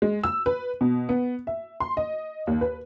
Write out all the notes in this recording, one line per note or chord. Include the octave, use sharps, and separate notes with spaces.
G#3
E6
B4
B2
B3
E5
C6
D#5
D#2
B4